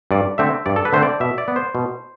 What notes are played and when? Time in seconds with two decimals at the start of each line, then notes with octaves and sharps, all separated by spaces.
0.11 G2 D5
0.38 D3 A3 C4 E5
0.66 G2 D5
0.76 A4
0.85 B4
0.93 D3 A3 C4 C5
1.03 D5
1.20 B2 E5
1.38 D5
1.48 B3
1.56 C5
1.75 B2